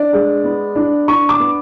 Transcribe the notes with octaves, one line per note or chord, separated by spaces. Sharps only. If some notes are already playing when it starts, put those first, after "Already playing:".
Already playing: D4 D5
G#3
B3
D4
D4 C#6
D6
B3